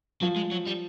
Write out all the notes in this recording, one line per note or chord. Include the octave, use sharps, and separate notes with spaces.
F3 F#3
G#3
F#3
G3